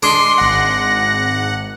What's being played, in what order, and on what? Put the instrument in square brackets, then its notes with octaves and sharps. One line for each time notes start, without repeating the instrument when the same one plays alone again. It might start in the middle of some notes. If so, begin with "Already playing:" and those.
[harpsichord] G#3 D4 G#4 [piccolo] C6
[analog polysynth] G#1 F#5 [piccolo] A#6